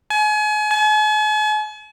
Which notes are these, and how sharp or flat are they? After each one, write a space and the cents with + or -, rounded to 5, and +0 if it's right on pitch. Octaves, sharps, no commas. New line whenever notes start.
G#5 +35
G#5 +45